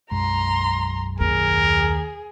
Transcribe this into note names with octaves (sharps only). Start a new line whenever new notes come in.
B1 F#2 G#3 A#5 C6
D#2 G#4 A#4